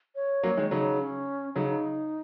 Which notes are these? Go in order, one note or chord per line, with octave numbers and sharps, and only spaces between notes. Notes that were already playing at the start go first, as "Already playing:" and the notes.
C#5
F#3 A#3
D#3 G#3
C#3 F#3 D#4
C#4
C#3 F#3 D#4
D#4